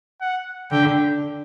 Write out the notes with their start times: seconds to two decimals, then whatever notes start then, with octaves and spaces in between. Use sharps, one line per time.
0.21 F#5
0.71 D3 G5